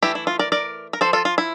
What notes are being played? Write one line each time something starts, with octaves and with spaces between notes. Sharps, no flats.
E3 A3 D4 E4 G4
E4
F4
A#4 D5
A#4 D5
A#4
F3 C4 A4 C5
F4 A4
F4
E4